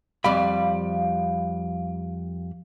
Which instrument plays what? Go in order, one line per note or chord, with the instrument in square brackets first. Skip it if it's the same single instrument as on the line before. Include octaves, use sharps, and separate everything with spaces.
[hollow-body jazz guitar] F2 G3 B5 [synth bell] F5